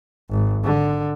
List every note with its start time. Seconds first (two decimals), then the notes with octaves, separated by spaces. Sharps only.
0.30 G#1
0.64 D3